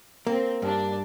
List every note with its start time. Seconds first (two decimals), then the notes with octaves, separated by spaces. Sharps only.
0.26 A#3 C4
0.62 G2 D4